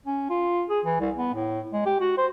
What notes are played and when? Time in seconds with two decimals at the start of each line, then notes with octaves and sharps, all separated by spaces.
0.06 C#4
0.30 F4
0.70 G#4
0.85 E3
1.00 C2
1.16 B3
1.33 A2
1.73 G#3
1.86 G4
2.00 F#4
2.18 C5